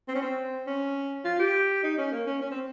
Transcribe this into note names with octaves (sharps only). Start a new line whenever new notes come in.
C4
C#4
C4
C#4
F4
G4
D#4
C#4
A#3
C#4
C#4
C4